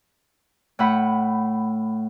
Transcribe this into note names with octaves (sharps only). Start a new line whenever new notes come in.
A2 F#5 B5